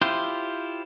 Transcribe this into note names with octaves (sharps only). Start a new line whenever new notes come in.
E4 F4 G4 C5